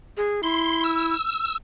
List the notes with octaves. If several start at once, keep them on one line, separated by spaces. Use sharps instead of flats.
G#4
E4 C6
E6